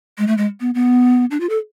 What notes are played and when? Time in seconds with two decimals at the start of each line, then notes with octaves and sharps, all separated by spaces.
0.18 G#3
0.27 A3
0.37 G#3
0.60 B3
0.75 B3
1.31 D4
1.40 F4
1.49 A4